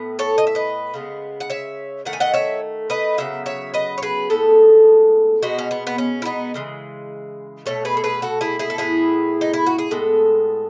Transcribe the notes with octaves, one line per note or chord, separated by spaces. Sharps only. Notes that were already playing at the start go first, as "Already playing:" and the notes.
Already playing: A2 B3
A4 C#5
D#5
E5
B4 D#5
C#3 G#3 B3
F#5
C#5 E5
D#3 A3 F#5
G#5
D#5 F#5
C#5 E5
B4 D#5
C#3 F#3 B3 E5
C#5 E5
B4 D#5
C#5
G#4 B4
A2 G#3 B3 A4
B2 G#3 B3 D#4 F#4
C#4
B3
B3
C#4
E4
B3 D#4
C#3 E3 G#3
B2 A3 A4 C#5
G#4 B4
A4
G#4 B4
F#4 A4
E4 G#4
E4 G#4
A4
A2 E3 B3 E4 G#4
D#4
E4
F#4
G#4
A2 G#3 B3 A4